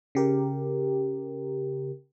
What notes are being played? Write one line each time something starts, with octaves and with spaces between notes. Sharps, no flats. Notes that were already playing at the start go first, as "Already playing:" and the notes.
C#3 G4 A#4